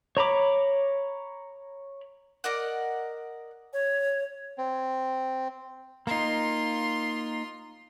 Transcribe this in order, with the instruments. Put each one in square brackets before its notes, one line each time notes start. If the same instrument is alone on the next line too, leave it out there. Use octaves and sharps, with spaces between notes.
[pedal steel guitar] C#5 A#5 B5 D6
[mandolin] A#4 D5 D#5 F#5
[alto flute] C#5
[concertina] C4
[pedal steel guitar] A#3 D#4 [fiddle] F4 C6